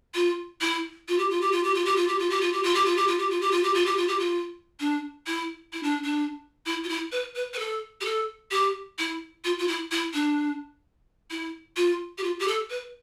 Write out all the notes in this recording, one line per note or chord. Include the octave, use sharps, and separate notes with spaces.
F4
E4
F4
G4
F4
G4
F4
G4
F4
G4
F4
G4
F4
G4
F4
G4
F4
G4
F4
G4
F4
G4
F4
G4
F4
G4
F4
G4
F4
G4
F4
D4
E4
E4
D4
D4
E4
F4
E4
B4
B4
B4
A4
G4
A4
G4
E4
F4
F4
E4
E4
D4
E4
F4
G4
F4
G4
A4
B4